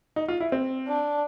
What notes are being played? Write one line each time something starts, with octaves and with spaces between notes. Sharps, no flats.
D#4
F4
E4
C4
D4